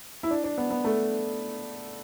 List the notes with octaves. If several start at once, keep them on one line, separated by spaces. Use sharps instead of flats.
E4
D4
D4
B3
B3
A3